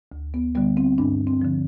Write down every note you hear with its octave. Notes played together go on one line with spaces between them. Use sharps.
D2
B3
D3 G3 B3
C4
G2 D4
C4
D3 F3